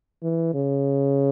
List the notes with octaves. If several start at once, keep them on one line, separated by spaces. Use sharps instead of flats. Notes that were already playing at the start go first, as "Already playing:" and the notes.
E3
C#3